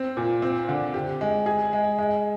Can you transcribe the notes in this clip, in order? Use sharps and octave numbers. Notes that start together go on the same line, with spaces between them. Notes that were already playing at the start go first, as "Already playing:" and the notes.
Already playing: C4
A#2
C4
D3
G4
G#3
G#4
G#3
G#3